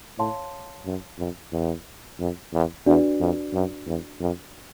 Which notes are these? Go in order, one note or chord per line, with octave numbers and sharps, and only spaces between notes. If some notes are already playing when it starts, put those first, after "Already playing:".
A2 C#5 F5 A5 C6
F#2
F2
E2
F2
E2
E2 D4 F#4 B4 D5
F2
F#2
E2
F2